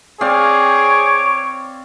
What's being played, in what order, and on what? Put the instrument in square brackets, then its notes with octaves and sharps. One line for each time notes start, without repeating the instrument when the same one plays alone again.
[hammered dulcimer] C4 D5 F5 [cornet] G#4 [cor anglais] C#5 [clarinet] D6